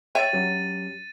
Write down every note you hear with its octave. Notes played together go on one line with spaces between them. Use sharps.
C#5 E5 G5 A6 D#7
F#3 C#4 G4